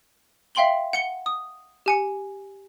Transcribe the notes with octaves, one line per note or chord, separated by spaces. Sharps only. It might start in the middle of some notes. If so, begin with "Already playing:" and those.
E5 F5 G5 C6 F#7 G7
F#5 C#7 G7
D#6
G4 G#5 C#7